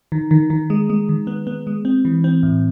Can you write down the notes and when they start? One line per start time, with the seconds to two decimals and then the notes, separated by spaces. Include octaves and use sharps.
0.12 D#3
0.31 D#3
0.50 D#3
0.70 G#3
0.90 G#3
1.09 D#3
1.27 B3
1.47 B3
1.67 G#3
1.85 C4
2.05 E3
2.24 C4
2.43 A2